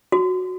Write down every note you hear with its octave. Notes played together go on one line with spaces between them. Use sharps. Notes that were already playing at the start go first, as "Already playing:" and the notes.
F#4